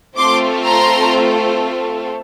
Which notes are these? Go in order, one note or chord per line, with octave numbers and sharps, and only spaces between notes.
A3 C4 F4 A4 C6 D6
A#5 C6